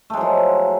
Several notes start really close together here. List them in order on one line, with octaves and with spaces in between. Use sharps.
A3 G#3 F#3 F3